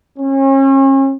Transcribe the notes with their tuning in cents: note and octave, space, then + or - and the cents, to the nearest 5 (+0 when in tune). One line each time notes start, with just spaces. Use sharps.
C#4 -40